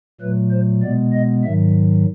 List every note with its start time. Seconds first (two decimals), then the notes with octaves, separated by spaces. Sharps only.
0.21 A#2 F#3 A3 B4
0.52 C5
0.82 B2 G#3 B3 D5
1.13 D#5
1.43 G#2 D#3 F#3 E5